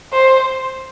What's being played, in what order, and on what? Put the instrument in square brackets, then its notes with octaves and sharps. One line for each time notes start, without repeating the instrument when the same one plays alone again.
[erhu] C5